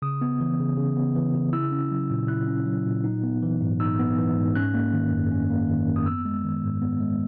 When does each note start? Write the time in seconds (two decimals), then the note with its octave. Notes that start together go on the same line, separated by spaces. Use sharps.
0.02 C#3 D#6
0.21 B3
0.41 E3
0.59 C#3
0.77 C#3
0.97 B3
1.16 E3
1.35 C#3
1.53 E4 E6
1.72 C#4
1.91 F#3
2.11 A#2
2.28 E4 F#6
2.47 C#4
2.66 F#3
2.86 A#2
3.04 D#4
3.24 B3
3.42 E3
3.61 G#2
3.80 D#4 E6
3.99 B3
4.18 E3
4.36 G#2
4.55 C#4 F#6
4.74 A#3
4.93 D#3
5.12 F#2
5.31 C#4
5.50 A#3
5.68 D#3
5.88 F#2
5.96 D#6
6.06 B3 E6
6.25 G#3
6.44 D#3
6.63 G#2
6.82 B3
7.01 G#3